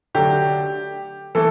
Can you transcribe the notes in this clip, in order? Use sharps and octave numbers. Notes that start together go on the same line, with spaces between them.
D3 F#3 A3 G4
E3 A3 A4